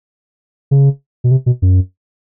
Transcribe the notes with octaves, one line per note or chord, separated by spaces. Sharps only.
C#3
B2
C3
B2
F#2